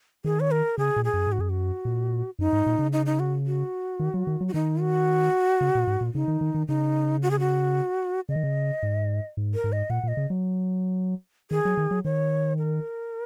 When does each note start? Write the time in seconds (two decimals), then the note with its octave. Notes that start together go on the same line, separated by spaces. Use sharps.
0.24 D#3 G#4
0.40 C#5
0.51 A#4
0.78 C#3 G#4
0.96 A#2
1.05 G#4
1.13 F#2
1.27 G#2
1.32 F#4
1.39 F#2 G#4
1.50 F#4
1.85 A#2
2.39 F#2 D#4
2.53 G#2
2.66 A#2
2.79 C#3
2.93 D#4
3.06 D#4
3.20 F#4
3.47 F#4
4.00 D#3
4.14 F#3
4.27 D#3
4.41 F#3
4.48 F#4
4.54 D#3 D#4
4.81 F#4
5.61 C#3
5.75 A#2
5.87 G#2
6.01 A#2
6.14 C#3 D#4
6.28 D#3
6.41 D#3
6.54 D#3
6.68 C#3 D#4
7.22 F#4
7.31 G#4
7.39 F#4
8.29 C#3 D#5
8.36 D#3
8.44 C#3
8.83 G#2
9.37 G#2
9.54 A#4
9.64 G#2
9.72 D#5
9.90 A#2 F#5
10.03 A#2
10.08 D#5
10.17 C#3
10.30 F#3
11.51 D#3 G#4
11.65 F#3
11.77 D#3
11.91 F#3
12.05 D#3 C#5
12.58 A#4